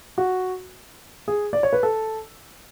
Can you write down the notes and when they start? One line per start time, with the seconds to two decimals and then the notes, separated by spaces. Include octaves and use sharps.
0.18 F#4
1.28 G#4
1.53 D5
1.63 C#5
1.73 B4
1.83 A4